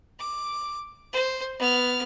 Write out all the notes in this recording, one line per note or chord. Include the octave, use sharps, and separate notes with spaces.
D6
C5
B3 F6